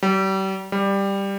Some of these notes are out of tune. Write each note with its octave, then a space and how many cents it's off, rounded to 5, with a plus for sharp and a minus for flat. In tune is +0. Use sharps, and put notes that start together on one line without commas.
G3 -35
G3 +10